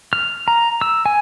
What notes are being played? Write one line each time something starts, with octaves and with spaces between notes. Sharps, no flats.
F6
A#5
E6
G#5